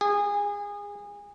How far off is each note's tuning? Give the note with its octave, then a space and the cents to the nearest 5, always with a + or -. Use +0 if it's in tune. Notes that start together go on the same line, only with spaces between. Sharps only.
G#4 -25